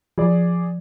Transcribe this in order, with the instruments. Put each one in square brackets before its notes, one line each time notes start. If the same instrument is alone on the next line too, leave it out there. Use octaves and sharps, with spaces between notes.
[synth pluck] F3 [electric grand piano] G#4 D5